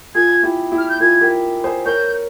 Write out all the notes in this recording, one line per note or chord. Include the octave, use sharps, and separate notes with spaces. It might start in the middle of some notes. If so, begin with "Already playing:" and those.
F4 G#4 G#6
E4 G4
E4 G4
F6
G6
F4 G#4 G#6
G4 A#4
G#4 C5
A#4 C#5 G6